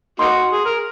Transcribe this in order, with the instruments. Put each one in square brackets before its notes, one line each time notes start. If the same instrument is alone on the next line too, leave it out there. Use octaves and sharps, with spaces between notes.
[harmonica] A#3 D#4 F#4 [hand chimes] C6
[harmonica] G#4
A#4